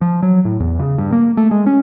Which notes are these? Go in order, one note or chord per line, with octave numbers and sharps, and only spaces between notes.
F3
F#3
A2
E2
C#3
G2
A#3
A3
G#3
C#4